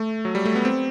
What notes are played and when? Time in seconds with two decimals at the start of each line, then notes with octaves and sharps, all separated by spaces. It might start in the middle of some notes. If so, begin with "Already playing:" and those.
Already playing: A3
0.25 F#3
0.35 G3
0.45 A3
0.55 B3
0.65 C4